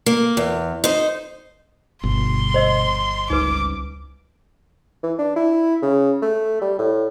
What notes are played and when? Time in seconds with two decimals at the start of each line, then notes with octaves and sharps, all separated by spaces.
0.06 A#3
0.37 E2
0.84 D#4 C5
2.03 G1 B2 C6
2.54 C5 D#5 E6
3.30 C#2 G3 D#4 B4 D6
5.03 E3
5.19 D4
5.36 E4
5.82 C#3
6.22 A3
6.61 G3
6.79 A2